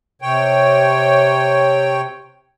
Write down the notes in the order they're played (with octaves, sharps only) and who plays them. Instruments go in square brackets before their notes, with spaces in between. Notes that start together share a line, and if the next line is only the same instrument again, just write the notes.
[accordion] C3 C#5 G5